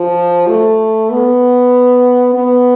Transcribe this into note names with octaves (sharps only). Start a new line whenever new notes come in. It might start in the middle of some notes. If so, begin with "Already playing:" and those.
Already playing: F3
A3
B3
B3